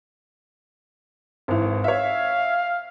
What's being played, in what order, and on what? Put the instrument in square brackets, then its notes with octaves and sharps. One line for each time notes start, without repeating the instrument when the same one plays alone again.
[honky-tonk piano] G#1 E3
[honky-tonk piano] C#5 E5 [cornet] F5